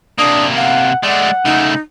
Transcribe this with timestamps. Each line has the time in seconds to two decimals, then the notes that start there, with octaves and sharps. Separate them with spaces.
0.18 C3 A#3 D4 D#6
0.57 F5 F#5
1.03 G#3 A3 D5 F#5
1.45 C#3 A3 D#4